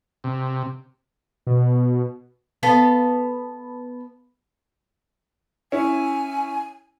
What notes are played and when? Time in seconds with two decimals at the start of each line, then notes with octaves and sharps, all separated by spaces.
0.24 C3
1.47 B2
2.63 B3 A4 F5
5.72 C#4 E4 G#5